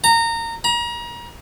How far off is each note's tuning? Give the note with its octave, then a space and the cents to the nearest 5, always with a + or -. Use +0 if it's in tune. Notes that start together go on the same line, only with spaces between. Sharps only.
A#5 -20
A#5 +35